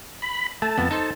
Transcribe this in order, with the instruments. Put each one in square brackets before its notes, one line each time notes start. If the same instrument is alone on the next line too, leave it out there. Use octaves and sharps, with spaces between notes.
[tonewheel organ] B5
[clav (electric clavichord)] A3 [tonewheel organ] A5
[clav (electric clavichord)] F2 B3
D#4 A4 C5